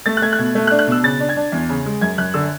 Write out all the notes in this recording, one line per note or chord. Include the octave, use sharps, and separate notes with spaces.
A3 A6
F#6
A3 G#6
F#6
B2 G#6
A3
F#6
D4
F#6
B2 E6
C#3 A6
D4
G#6
D4
E2
C#3
G#3
F#2 G#6
F#2 F#6
D3 E6